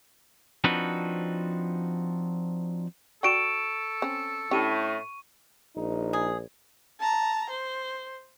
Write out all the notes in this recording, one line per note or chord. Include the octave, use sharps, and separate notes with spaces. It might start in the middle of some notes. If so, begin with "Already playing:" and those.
F3 C4 D4 D#4 F#4 B4
F#4 A4 D5 G5 C#6 D7 E7
C4 C#4
A2 A3 C#4 D4 G4 C#6 D#7
A#1 D#4
G#4
A5 A#5
C5